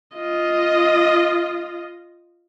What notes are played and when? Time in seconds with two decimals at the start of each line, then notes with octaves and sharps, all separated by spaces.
0.17 F4 D#5